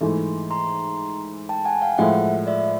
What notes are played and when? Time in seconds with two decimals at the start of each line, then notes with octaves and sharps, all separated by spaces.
0.01 G#2 E3 A3
0.51 A#5 C6
1.49 G5 A5
1.65 F#5 G#5
1.81 F5 G5
1.98 A2 F3 G#3 E5 F#5
2.47 D5 E5